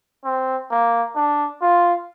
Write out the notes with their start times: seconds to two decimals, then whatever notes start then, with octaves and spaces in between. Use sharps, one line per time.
0.25 C4
0.71 A#3
1.16 D4
1.62 F4